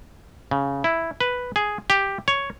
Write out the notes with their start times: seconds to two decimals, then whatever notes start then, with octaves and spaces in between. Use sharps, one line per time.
0.51 C#3
0.84 E4
1.20 B4
1.56 G#4
1.90 G4
2.28 C#5